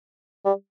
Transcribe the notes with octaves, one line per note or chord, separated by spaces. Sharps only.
G3